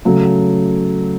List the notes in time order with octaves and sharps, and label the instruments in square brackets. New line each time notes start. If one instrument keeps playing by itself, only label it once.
[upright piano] C#3 F#3 A3